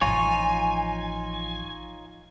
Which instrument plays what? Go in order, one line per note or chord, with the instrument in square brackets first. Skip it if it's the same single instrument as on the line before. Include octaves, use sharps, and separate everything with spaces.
[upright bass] A1 F3 [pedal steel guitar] D#4 F4 C#5 [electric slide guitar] G#5